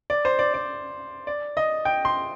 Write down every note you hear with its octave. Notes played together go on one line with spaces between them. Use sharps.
D5
C5
D5
D5
D5
D#5
G5
C6